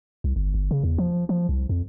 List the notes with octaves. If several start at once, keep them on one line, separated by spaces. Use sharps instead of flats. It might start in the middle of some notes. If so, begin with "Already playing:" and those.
C2
G1
G1
C#3
E2
F3
F3
C2
F2